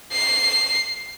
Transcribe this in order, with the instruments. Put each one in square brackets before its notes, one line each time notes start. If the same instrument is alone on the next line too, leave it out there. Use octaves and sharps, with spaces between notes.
[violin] C7